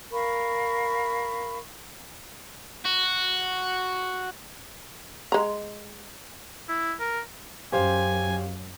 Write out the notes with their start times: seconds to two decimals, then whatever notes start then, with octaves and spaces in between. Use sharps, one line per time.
0.11 A#4 F5 B5 C#6
2.85 F#4
5.32 G#3 A#5
6.69 E4
7.00 A#4
7.72 F#2 G4 C5 F5 G#5